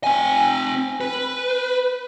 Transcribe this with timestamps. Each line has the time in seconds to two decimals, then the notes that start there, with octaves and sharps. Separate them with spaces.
0.04 C4 G#5
1.01 B4